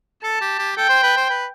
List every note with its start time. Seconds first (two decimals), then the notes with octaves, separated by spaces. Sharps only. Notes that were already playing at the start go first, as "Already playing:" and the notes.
0.23 A4 A5
0.41 G4
0.59 G4
0.77 A4 G5
0.89 C5
1.03 B4
1.17 C5
1.30 B4